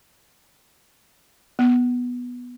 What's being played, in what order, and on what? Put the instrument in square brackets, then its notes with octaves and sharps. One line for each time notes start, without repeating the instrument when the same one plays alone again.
[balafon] B3